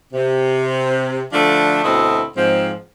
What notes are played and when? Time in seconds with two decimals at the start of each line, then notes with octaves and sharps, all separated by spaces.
0.13 C3
1.32 D3 F3 A3 D4
1.83 D2 B2 C4 E4 A4 D#5
2.35 G#2 F3 C4